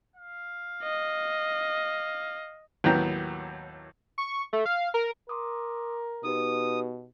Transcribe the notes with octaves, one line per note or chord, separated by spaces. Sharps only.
F5
D#5
D#2 A2 F#3 B3 G5 A#5
C#6
A3
F5
A#4
A#4 C6 D6 D#6
B2 D#4 G4 B4 D#6